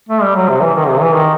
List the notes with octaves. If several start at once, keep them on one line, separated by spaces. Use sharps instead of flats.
A3
G3
F#3
C3
E3
D#3
C3
E3
D#3